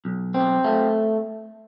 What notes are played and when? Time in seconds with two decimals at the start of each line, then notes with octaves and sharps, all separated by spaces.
0.05 B1
0.34 C4
0.64 A3